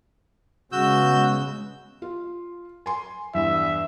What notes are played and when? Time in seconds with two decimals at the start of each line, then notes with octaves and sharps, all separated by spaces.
0.72 C#3 G#3 B3 F#4 E6 G6
2.02 F4
2.86 G#5 C6
3.34 E2 G2 E5